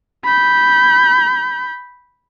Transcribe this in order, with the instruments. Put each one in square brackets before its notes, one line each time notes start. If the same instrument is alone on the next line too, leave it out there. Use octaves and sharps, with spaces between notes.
[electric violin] B5 G6